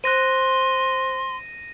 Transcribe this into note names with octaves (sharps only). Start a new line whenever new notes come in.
C5 C6 F#6 A#6 D#7